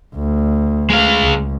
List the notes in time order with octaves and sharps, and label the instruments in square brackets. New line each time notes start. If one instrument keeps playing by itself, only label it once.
[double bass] D2
[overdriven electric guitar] G#3 F5
[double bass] C#2